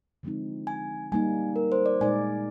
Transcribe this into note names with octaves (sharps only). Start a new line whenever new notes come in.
D3 F3 G#3 C4 D#4
G#5
G3 A#3 D#4 G#5
A#4
C5
D5
A#2 G#3 D#4 A#4 D5 G#5